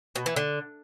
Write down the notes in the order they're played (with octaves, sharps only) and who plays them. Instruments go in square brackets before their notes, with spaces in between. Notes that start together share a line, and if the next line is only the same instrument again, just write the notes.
[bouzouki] B2
E3
D3